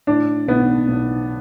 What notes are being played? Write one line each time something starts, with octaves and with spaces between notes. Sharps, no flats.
A2 D4
B1 B3
B1